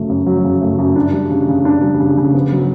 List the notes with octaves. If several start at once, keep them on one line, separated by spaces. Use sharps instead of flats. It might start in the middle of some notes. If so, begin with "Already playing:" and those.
Already playing: C#3 F#3 A3
F#2
F#3
C#3
A3
F#2
D4
G3
C#3
C#3
D4
G3
C#3
C#3
B3
F#3